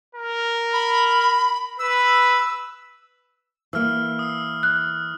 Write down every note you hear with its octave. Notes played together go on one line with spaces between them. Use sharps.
A#4
B5
B4 E6
E3 A#3 E6 F6
D#6 E6
F#6